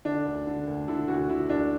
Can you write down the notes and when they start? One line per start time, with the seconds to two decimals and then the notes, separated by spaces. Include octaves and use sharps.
0.05 D3 D4
0.26 D2
0.47 D3
0.67 D2
0.88 D3 E4
1.08 D2 F#4
1.29 D3 E4
1.49 D2 D4